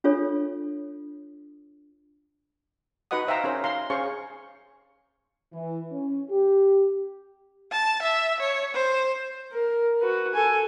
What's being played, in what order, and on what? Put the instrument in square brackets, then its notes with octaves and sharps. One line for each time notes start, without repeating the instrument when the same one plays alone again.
[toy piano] D4 F4 A4 C#5
[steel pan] D#4 F#4 B4 D#5 F#5 D#6
C5 E5 F5 G5 A#5
C#4 D#4 A#4 C5
F5 A#5 C6
C#4 G#4 C5 F5 C#6
[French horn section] E3
C#4
G4
[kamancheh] A5
E5
C#5
C5
[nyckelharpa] A#4
F#4 B4
A4 G#5